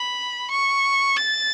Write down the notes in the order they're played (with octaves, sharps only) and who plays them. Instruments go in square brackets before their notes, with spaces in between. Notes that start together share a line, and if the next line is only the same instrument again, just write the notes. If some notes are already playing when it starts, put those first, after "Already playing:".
Already playing: [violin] B5
C#6
A6